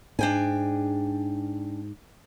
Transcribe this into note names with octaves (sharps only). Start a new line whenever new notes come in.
G#2 D4 G5 G#5